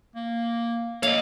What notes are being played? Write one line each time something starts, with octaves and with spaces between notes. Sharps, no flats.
A#3
A#3 C#5 D#5 F5